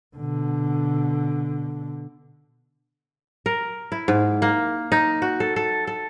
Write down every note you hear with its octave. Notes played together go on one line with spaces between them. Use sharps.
B2 D3
A#4
E4
G#2
A#3
D#4
F#4
A4
A4
A4